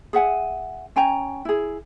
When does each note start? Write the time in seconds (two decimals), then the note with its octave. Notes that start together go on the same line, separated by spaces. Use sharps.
0.13 G#4 E5 F#5 G#5
0.96 C#4 G5 G#5 A#5
1.45 E4 G#4